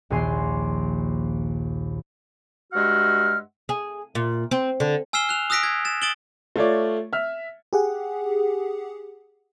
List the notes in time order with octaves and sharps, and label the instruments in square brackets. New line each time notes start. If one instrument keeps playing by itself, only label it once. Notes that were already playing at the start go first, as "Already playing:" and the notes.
[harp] A#1 D#2 F3 G#5 C6 C7
[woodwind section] G2 G#3 F#4 E5 F#5 F6
[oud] G#4
A#2
C4
D3
[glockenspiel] G#5 E6 F6 C7 E7 G7
F#6 F7
D#6 E6 F#6 A#6 B6 D7
G#6
A6 E7
D#6 A6 D7 E7 F#7 G7
[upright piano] A3 F4 C#5 D5
E5 F6
[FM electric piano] G4 G#4 F#5